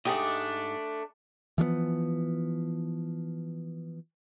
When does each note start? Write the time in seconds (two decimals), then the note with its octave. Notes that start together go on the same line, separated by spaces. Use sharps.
0.05 G#2 A3 D4 G4 D#5
1.58 E3 F3 A3 B3